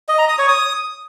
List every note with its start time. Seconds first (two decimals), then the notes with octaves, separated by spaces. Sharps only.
0.08 D#5
0.18 A#5
0.28 D#6
0.38 C#5
0.48 D#6